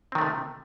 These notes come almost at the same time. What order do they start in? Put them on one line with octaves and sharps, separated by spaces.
C4 D#3 A3 C3